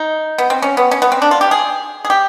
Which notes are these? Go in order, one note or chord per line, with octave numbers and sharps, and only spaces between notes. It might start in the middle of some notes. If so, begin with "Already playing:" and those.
Already playing: D#4
B3
C4
C#4
B3
C#4
B3
C4
D4
F4
G4
G#4
G#4
G4